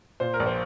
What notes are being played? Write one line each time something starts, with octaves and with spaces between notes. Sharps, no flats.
A#2 C5
A#4
A#1
C5